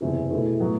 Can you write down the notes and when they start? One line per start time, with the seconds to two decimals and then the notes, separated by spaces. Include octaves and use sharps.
0.01 F#1 E2 C3 E3
0.30 E2 B2 A3 E4
0.60 A2 F#3 B3